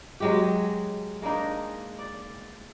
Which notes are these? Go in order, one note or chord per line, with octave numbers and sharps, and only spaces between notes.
F#3 G#3 G4
G#3 A#3 D4 D#4
D5